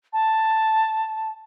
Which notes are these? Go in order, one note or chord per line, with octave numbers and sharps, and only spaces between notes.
A5